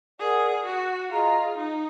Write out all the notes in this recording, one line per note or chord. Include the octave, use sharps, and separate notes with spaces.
G#4 A#4 D5 F#5
F#4
F4 G#4 D#5 A#5
D#4